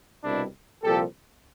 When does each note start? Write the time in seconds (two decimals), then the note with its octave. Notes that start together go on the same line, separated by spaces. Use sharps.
0.24 C2 B2 G3 D4 E4
0.83 C2 A#2 F3 G4 A4